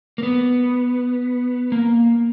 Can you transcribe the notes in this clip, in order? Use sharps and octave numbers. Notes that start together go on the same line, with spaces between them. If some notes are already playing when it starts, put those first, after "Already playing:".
A#3
B3
A#3